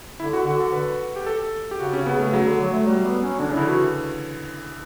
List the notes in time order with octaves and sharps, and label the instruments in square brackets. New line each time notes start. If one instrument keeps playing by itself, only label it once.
[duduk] D3 [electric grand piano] E4
[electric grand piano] F#4
[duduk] D3 [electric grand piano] F#4
[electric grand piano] A4
B4
G4
A4
G4
[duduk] C#3 [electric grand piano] F#4
[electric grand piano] C#4
[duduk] C#3
[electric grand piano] B3
[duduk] C#3 [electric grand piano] A3
[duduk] C#3 [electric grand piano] F#3
[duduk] D3
F#3
A3
[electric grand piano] F#3 [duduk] G3
[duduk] B3
C#4
[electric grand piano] D3 [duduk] D4
[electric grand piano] C#3
[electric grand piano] D3 [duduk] E4
[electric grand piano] E3 [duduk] F#4